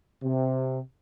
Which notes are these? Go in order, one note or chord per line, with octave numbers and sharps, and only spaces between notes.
C3